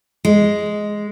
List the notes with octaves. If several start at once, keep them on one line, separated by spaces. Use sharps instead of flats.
G#3